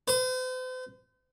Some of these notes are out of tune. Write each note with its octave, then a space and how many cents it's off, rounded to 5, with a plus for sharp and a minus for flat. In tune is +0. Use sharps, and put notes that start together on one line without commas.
C5 -45